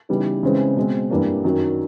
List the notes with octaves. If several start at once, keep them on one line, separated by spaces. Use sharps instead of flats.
C#3 E3 G3 B3 D#4
C#3 E3 G#3 C4
B2 G#3 C4
G2 E3 G3 A#3 D4
F#2 D#3 F#3